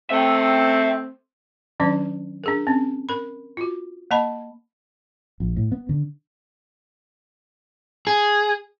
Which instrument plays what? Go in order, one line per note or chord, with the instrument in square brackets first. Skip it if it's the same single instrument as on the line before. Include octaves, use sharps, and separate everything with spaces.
[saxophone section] A3 C4 [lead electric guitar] E5 G5
[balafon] D#3 F#3 C#4 D4 D5
D4 G#4 A#4
C4 C#4
A#4 B5
F4 F#4
A#3 D#5 A5 B5
[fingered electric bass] A#1
A2
B3
D3
[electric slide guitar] G#4